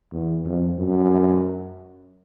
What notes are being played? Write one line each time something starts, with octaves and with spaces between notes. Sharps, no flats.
E2
F2
F#2